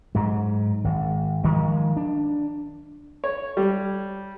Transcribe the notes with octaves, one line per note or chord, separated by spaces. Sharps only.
G#2 F#3
G#1
D#3 F3 F#3 G#3
D4
C#5
G3